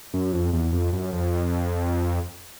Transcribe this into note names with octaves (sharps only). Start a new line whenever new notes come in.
F#2
F2
E2
F2
F#2
F2